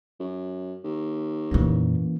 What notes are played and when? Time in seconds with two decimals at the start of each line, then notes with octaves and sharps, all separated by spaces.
0.20 F#2
0.84 D#2
1.51 F2 A#2 E3 A#3 C#4